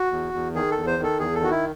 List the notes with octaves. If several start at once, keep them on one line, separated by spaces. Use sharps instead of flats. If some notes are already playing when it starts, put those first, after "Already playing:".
Already playing: F#4
E2
E2
D#3 G#4
A4
E2
C5
D#3
A4
E2 G#4
A4
D#3 F#4
E4